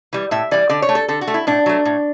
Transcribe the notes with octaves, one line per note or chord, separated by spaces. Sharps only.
E3 G3
A2 E5
E3 G3 D5
D3 D5
C#5
A3
A4
D3 A4
F#4
A3
E4
A2 D4
F#3 A3
A2